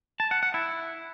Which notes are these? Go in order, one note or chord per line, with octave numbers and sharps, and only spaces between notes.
A5
F#5
F#5
E4